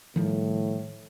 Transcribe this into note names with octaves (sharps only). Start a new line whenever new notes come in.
A2 D#3 F3 G3